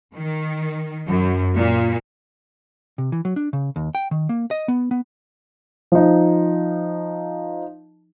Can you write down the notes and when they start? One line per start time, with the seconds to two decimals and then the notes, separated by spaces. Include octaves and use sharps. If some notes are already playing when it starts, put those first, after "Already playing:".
0.15 D#3
1.07 F#2
1.55 A#2
2.98 C3
3.12 E3
3.25 F#3
3.36 D4
3.53 C#3
3.76 D#2
3.95 G5
4.11 D#3
4.29 A#3
4.51 D#5
4.68 B3
4.91 B3
5.92 F3 D#4